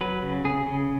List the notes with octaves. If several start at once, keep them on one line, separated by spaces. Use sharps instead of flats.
F#3 B4
C#3
C#3 G#4
C#3